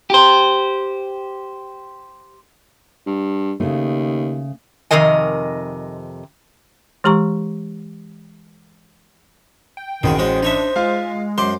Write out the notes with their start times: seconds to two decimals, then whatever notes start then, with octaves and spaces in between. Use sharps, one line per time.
0.10 G4 C5
3.06 G2
3.60 D#2 C#3 A3
4.91 F2 C3 D#3 A#4 D#5 G#5
7.04 E3 G#3 G4 A#5 C#6
9.77 G5
10.03 A1 D#3 C4 F#4 G#4
10.19 G#3 C#4 F#4 C5
10.43 D4 D#4 C#5 E5
10.76 G#3 F4 F5
11.38 F#2 C5 C6 D6